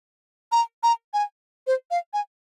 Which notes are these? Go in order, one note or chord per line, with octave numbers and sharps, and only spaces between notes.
A#5
A#5
G#5
C5
F5
G#5